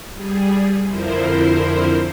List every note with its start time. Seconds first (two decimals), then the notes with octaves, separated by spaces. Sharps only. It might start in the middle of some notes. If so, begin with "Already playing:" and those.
0.13 G3 G#4
0.87 F2 D3 F3 E4 A#4 C5